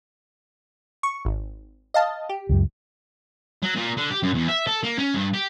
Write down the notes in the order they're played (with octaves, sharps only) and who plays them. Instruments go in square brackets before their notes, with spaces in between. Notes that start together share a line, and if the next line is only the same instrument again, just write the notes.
[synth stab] C#6
G#1
D#5 F5 A5
G4
[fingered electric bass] C#2 F#2
[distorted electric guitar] F#3
A#2
D3
G4
F#2
E2
E5
A4
A#3
C#4
G2
G4